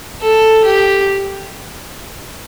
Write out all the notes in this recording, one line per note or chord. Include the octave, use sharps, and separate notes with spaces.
A4
G4